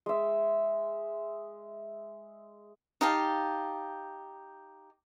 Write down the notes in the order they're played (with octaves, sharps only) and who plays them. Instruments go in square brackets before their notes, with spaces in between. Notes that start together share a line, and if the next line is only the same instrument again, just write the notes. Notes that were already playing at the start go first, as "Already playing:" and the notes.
[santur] G#3 E5
[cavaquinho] D#4 G4 F5 A5